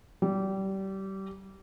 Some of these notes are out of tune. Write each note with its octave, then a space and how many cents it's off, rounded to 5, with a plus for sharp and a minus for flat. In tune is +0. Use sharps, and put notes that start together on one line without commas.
G3 -25